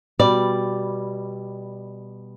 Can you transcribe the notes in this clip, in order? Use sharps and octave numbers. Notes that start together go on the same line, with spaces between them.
B2 G3 D5